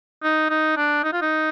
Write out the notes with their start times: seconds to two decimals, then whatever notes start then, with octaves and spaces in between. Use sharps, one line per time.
0.23 D#4
0.50 D#4
0.77 D4
1.03 D#4
1.13 F4
1.22 D#4